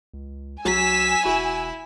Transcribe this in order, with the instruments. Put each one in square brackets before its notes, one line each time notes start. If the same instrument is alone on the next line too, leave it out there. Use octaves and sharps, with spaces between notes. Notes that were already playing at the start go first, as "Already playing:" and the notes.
[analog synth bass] C#2
[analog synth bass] B1 [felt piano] F#3 [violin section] G#5 E6 [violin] B6
[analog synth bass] E1 [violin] E4 [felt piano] F#4